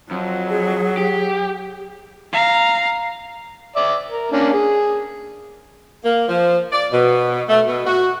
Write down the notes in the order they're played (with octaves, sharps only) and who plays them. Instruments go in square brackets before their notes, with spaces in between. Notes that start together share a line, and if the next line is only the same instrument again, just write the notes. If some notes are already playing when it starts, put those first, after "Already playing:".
[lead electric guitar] F2 [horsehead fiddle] F#3
[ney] G#4
[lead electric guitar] G4
[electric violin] F5 A#5
[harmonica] D5 E5 D6
A#4
A#3 C#4 D4
G#4
[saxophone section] A#3
F3
D5
B2
A3
B2
F#4